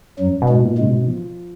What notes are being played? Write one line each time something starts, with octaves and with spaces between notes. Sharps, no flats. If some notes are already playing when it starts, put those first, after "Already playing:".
F#2 F#3
B2
G#2 G#3
A#2
G#2 C#3 G#3
B2
F3